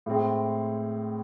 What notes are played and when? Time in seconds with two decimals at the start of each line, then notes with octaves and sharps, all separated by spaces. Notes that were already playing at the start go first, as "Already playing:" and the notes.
0.06 A2 G#3 C4 G#4